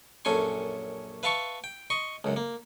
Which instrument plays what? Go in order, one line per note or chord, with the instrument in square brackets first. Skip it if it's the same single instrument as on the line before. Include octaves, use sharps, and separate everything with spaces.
[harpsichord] A#1 F#2 C#4 A4 G#5 C6
B4 E5 F5 A5 C6 C#6
G5
D#5 C6 C#6
C#2 F#2
A#3